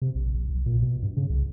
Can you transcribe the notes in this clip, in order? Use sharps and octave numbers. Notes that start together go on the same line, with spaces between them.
C3
A#1
A#1
B1
A#2
B2
G2
C#3
C2